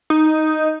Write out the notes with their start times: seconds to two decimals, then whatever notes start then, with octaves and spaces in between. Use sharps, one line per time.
0.10 D#4